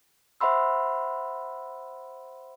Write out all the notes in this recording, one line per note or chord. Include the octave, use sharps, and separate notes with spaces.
C5 E5 F#5 B5 C6 E6